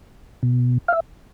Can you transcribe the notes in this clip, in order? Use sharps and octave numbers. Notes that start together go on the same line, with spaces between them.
B2
F5
E5